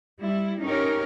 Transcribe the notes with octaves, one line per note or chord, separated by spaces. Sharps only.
G3 E4
C#4 D#4 G4 A#4 C#5